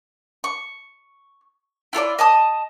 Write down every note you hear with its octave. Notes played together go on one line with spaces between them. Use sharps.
C#6
E4 F4 A4 D5
D#5 A5 D#6